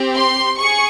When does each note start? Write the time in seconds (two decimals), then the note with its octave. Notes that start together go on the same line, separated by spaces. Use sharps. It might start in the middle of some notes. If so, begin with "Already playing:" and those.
Already playing: C4 G4
0.14 C6
0.59 G#4 C#6